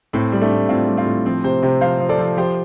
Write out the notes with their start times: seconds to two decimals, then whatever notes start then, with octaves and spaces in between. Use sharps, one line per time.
0.13 A2 C4
0.32 G3
0.41 A3 D4
0.51 A2
0.69 A2 C4 F4
0.88 G3
0.97 C4 F4
1.06 A2
1.26 F3 C4
1.44 C3 G4 C5
1.63 C3 G4 C5
1.81 F3 C5 F5
2.00 F3
2.09 A4 D5
2.18 F3
2.37 F3 G4 C5